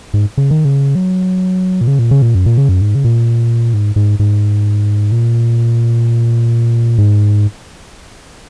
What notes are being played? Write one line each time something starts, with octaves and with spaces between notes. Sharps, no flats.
G#2
C#3
D#3
C#3
F#3
A#2
C#3
A#2
C#3
A#2
F#2
A#2
C#3
F#2
G#2
C#3
A#2
G#2
G#2
G#2
A#2
G#2